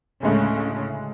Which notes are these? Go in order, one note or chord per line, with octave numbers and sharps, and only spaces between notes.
D2 A2 C#3 G#3 A3